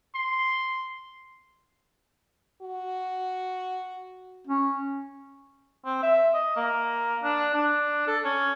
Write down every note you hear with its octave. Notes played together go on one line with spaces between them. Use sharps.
C6
F#4
C#4
C4
E5
D#5
A#3
D4
D4
A4
C#4